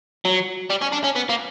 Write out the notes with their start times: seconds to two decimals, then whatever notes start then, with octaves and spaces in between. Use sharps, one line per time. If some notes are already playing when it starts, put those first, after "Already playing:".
0.25 F#3
0.70 G3
0.82 C#4
0.92 D4
1.04 C#4
1.16 B3
1.30 A#3